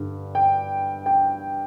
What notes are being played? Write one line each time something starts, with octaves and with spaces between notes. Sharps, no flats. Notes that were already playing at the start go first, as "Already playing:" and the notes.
Already playing: G2 D3 G3
G5
G5